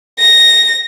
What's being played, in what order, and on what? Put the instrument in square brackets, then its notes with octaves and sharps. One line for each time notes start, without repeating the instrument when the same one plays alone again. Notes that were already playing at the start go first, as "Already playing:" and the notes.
[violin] A#6